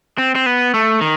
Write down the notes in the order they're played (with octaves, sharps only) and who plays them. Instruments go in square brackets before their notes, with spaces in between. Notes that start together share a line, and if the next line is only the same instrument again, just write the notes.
[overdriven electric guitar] C4
C4
B3
A3
D#3